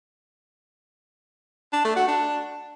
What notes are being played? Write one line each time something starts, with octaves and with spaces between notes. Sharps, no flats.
D4
A3
F#4
D4